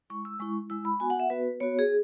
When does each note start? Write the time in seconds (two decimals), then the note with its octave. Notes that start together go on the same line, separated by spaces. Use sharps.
0.10 G#3 E4 C#6
0.25 E6
0.39 G#3 E4 C#6
0.70 G#3 E4 E6
0.85 B5
1.00 B3 F#4 G#5
1.10 F#5
1.20 E5
1.30 B3 F#4 B4
1.60 B3 F#4 C#5
1.79 G#4